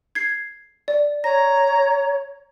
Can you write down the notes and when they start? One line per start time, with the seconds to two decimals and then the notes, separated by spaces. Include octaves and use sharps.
0.15 G#6 C7
0.88 D5
1.24 C#5 A#5 A#6